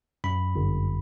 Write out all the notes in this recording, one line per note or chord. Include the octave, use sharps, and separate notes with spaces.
F#2 B5
G1